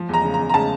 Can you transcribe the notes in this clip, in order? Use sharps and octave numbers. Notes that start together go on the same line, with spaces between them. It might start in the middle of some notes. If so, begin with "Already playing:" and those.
Already playing: F3
E2 A#5
C#3
A#5
E2
A#5
C#3 A5